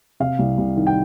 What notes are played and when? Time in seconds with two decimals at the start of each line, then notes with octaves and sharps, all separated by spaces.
0.20 C3 F5
0.39 C2
0.58 C2
0.77 D#3
0.87 G5